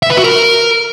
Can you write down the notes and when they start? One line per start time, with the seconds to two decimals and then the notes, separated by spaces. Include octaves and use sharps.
0.03 E5
0.10 B4
0.17 F#4
0.24 A#4